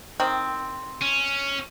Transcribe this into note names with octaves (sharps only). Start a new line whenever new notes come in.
D#3 C4
C#4